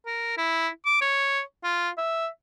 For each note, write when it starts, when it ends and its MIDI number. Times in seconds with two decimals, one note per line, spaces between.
0.06 0.35 70
0.38 0.69 64
0.86 1.01 86
1.02 1.41 73
1.64 1.90 65
1.98 2.28 76